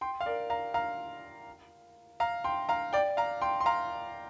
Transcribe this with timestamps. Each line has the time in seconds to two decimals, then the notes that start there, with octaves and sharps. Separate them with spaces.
0.01 G5 C6
0.21 F5
0.26 A#4 D5
0.50 F5 A#5
0.74 F5 A#5
2.20 F5 A#5
2.44 G5 C6
2.69 F5 A#5
2.93 D5 G5
3.17 F5 A#5
3.42 G5 C6
3.60 C6
3.66 F5 A#5